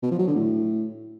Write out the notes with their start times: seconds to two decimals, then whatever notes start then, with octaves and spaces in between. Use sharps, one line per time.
0.03 B2
0.11 F3
0.19 F#3
0.27 D3
0.35 A2